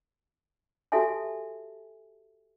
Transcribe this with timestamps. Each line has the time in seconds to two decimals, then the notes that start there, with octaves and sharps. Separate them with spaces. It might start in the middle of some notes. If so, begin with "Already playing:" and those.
0.92 F#4 G4 A4 E5 G#5 A5